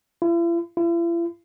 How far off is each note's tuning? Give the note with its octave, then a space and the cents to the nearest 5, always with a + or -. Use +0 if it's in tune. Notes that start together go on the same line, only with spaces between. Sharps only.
E4 +45
E4 +45